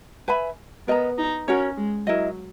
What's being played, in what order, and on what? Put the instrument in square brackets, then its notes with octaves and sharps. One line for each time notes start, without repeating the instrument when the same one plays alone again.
[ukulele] B4 E5 G#5 B5
[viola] B3 [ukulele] A#4 D#5 A#5
[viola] D#4
[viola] C#4 [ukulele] F#4 A#4 C#5
[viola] G#3
[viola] F#3 [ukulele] E4 A#4 D#5